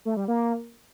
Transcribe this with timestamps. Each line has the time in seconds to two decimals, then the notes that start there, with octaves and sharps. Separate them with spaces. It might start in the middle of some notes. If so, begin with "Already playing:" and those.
0.05 A3
0.17 G3
0.28 A#3